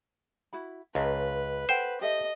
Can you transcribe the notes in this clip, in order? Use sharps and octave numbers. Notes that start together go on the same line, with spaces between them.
E4 F#4 B5
C#2 C#4 B4 A5 A#5
A4 C5 F#5 G5
G4 A4 D#5 E5